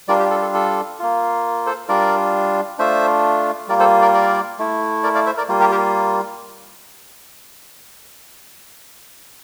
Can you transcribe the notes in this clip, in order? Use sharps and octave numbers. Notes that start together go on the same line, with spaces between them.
G3 D4 F4 A#4 D5
G4
A4
A4
A4
A#3 F4
A4 C5
G3 D4 F4 A#4 D5
A3 D4 F4 C5 E5
G3 A#3 F4 A#4 D5
A4 C5
A#4 D5
A#4 D5
A3 E4
A#4 D5
D5 F5
C5 E5
A#4 D5
G3 A#3 F4
G4 A#4
G4 A#4